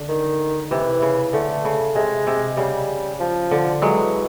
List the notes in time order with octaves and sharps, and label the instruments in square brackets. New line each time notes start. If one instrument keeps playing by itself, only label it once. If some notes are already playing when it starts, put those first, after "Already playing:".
Already playing: [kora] D3
[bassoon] D#3
[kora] C3 [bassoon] E3
[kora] C#3
[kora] D3 [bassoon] A3
[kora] C#3
[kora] C3 [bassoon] G#3
[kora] C3
[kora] C#3 [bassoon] G3
[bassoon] F3
[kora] D3
[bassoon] E3 [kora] F#3 G#3